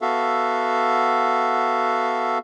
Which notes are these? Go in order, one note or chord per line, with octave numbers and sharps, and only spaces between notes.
B3 F#4 A4 E5 F5